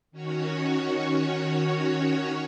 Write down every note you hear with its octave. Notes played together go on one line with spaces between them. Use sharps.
D#3 C#4 F#4 C#5